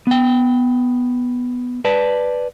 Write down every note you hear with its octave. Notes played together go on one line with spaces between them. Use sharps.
B3 G5
B4 D5 A5